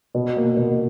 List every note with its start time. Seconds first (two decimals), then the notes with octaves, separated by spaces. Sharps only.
0.15 B2
0.37 A#3
0.57 B2